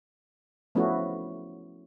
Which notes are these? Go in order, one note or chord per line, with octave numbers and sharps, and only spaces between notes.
F3 A3 B3 C#4 E4 F#4